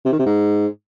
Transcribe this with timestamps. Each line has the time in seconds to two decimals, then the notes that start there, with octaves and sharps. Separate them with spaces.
0.05 C3
0.12 D#3
0.19 C3
0.26 G#2